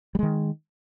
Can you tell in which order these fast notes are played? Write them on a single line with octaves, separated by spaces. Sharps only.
G3 G#3 D#3